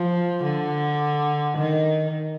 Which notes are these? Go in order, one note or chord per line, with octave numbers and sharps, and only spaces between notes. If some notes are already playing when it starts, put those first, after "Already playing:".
Already playing: F3
D3
D#3